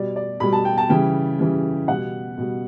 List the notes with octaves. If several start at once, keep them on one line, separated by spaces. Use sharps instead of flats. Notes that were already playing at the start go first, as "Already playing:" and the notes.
Already playing: B2 G3 D5
D5
B2 G3 B5
A5
G5
A5
C#3 E3 G3 G5
C#3 E3 G3
B2 G3 F#5
B2 G3